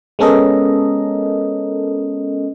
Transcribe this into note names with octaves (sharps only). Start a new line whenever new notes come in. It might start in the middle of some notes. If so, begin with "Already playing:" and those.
G#3 B3 C#4 A4 A#4 D#5